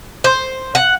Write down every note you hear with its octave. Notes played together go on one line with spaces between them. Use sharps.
C5
F#5